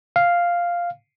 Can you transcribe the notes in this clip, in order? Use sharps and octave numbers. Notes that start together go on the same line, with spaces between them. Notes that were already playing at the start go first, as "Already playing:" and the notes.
F5